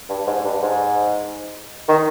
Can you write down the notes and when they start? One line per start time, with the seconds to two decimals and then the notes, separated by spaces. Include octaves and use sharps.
0.09 G2
0.27 G#2
0.45 G2
0.62 G#2
1.88 D#3